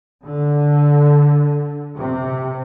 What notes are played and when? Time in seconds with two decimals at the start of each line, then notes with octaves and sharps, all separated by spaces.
0.24 D3
1.97 C3